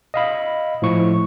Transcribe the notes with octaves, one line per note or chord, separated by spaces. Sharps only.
D#5 F5 B5
A2 F3 C#6